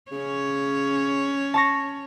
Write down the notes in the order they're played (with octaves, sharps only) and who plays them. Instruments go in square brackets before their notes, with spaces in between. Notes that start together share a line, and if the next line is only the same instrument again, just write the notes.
[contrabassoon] C#3 [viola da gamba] C#4 C#5
[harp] A5 C#6 A#6